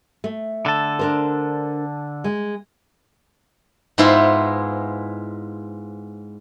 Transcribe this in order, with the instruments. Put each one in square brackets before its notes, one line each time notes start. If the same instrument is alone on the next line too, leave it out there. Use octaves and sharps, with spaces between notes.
[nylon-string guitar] A3
[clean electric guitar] D3 A4
[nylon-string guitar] D4 A#4 C5
G#3
[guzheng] G#2 G#3 B3 E4 F4 C5